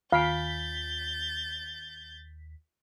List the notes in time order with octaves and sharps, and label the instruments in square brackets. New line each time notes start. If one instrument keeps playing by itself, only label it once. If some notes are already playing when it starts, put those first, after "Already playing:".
[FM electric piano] D#2 B6 [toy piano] F4 G#5 [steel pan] F5 [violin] G6 A6